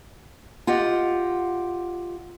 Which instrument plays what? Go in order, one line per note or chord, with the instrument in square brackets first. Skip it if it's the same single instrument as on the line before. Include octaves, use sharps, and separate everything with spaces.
[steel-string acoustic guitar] F4 G4 D#5 F#5